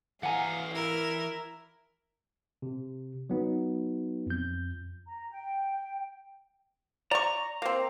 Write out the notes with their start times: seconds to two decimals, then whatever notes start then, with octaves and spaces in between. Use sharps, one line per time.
0.23 E3 F5 F#5 G#5 A#5
0.75 E4 A#4
2.62 C3
3.30 F#3 B3 D#4
4.26 F2 G6
5.07 A#5
5.31 G5
7.11 D5 A#5 C#6
7.62 A#3 C4